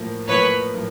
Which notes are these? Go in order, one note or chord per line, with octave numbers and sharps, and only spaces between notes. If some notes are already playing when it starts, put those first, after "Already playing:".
Already playing: A2 F3 A#3
A2 F3 A#3 B4 C#5
A2 F3 A#3